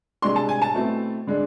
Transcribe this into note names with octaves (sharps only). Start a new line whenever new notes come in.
C3 G#3 D4 C6
A5
G#5
A5
B2 A3 C4 E4
D3 G#3 D4